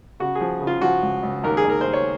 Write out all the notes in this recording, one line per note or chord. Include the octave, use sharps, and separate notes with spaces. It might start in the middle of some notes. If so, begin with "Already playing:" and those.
C#3 F#4
G#4
F3
C#3
F4
F3 F#4
C#2
C#2
D#2 A#4
G#4
D#2 A#4
D#2 C5
C#5